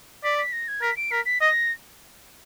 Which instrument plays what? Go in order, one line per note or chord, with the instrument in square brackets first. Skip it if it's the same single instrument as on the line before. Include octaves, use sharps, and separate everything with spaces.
[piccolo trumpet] D5 [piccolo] B6
[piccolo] B6
A#6
G#6
[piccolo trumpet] A#4 [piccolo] B6
[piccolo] D7
[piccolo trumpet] A#4 [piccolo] B6
[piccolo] B6
[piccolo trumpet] D#5 [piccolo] A#6